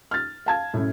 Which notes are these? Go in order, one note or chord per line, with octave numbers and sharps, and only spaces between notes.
F6 A6
F5 A5 G#6
F#2 A2